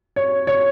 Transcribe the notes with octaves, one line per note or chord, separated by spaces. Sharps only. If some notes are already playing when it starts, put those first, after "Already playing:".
C#5
C#5